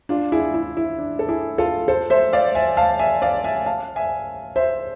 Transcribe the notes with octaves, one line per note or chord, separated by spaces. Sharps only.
D4 F4
E4 G#4
E4
E4
D4
A4
E4 G#4
F4 A4
A4 C5
C5 E5
D5 F5
E5 G#5
F5 A5
E5 G#5
D5 F5
E5 G#5
F5 A5
E5 G#5
C5 E5